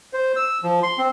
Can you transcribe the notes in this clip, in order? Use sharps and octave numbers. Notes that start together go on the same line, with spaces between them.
C5
E6
F3
C6
C4